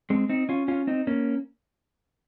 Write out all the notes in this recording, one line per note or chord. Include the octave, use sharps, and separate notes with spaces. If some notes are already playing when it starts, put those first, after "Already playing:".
G#3 C4
C4 D#4
C#4 F4
C#4 F4
C4 D#4
A#3 C#4